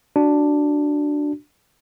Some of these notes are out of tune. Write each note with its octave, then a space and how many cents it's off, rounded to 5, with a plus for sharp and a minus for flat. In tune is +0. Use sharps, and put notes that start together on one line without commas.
D4 +0 F#4 +0